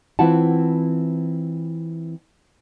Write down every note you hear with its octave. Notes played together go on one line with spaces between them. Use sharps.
E3 C4 E4 F4 F#5 A5